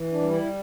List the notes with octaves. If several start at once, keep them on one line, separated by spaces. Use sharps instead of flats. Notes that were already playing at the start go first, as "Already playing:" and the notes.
Already playing: E3
D4
G3
E4